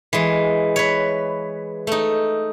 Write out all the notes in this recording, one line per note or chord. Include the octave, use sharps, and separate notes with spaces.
E3 G#3
B4 C#5
A3 D#4